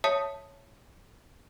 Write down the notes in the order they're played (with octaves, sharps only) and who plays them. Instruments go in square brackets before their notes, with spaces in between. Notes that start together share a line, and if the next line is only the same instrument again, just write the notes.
[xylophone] C#5 E5 A5 D#6 B6 C#7